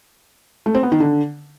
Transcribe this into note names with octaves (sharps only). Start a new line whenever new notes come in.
A3
C4
B3
D#3
D3